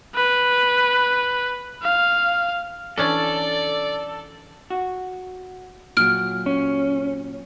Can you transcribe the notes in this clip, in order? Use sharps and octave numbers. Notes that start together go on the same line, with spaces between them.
B4
F5
E3 C#4 D4 A4 D5
F#4
A#2 F#3 F6 D7
C#4